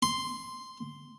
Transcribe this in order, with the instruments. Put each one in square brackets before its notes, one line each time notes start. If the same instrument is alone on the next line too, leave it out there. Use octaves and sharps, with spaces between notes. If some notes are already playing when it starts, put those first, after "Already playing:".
[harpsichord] C6